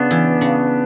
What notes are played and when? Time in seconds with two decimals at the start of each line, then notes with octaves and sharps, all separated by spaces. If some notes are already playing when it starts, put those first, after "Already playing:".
Already playing: C#3 B3 D4
0.11 E3
0.41 C#3